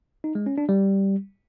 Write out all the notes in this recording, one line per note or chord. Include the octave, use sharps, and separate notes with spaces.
D#4
G#3
C#4
D4
G3